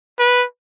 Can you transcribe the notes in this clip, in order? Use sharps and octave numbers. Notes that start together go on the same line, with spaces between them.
B4